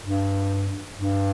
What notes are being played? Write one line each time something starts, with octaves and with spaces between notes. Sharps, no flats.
G2
G2